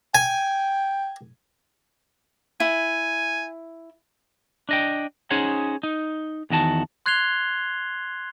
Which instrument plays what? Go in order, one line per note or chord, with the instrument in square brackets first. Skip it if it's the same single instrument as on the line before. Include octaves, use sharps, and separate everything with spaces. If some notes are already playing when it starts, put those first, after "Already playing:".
[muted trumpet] G5 [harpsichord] G#5
[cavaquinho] E4 [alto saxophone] G#5
[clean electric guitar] D4 D#5 G5
C#4 D#4 G#4 C5 C#5 F#5
D#4
E2 D#3 F#4 A5
[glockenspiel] C6 F#6 G#6 C7 F7 G7